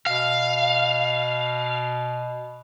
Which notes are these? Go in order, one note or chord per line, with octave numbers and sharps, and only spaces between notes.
B2 F5